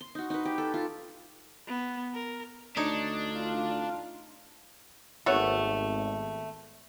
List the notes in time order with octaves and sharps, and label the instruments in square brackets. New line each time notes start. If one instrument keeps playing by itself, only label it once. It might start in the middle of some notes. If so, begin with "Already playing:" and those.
[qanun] C6
D#4 F#4
D#4 B4
G4
A4
F4 G4
[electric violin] B3
A#4
[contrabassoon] D2 [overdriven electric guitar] D4 [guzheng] D#4 C#5
[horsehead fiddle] F4 F5
[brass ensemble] G#1 [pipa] A3 B3 C#5